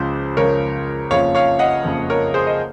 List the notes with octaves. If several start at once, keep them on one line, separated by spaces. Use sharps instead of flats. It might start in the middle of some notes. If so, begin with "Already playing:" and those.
Already playing: C#2 C#3 F3 C5
C#2 C#3 F3 A#4 C#5
F#1 F2 C#3 F3 C#5 F5
C#5 F5
D#5 F#5
F#1 F2 C#3 F3
A#4 C#5
G#4 C5
D#5